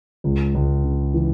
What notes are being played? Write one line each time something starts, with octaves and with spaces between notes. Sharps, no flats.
C#2
C#2
C#3
E3